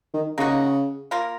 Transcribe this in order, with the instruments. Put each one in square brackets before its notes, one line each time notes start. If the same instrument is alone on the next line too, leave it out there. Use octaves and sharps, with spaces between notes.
[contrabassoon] D#3
[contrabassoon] C#3 [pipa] A#3 D#4 F#4
[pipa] A#3 F4 A#4